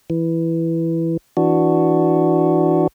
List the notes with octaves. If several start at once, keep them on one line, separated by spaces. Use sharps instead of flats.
E3
E3 D4 F#4